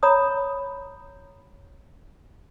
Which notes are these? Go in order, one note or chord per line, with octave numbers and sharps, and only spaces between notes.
C#5 A#5 B5 D#6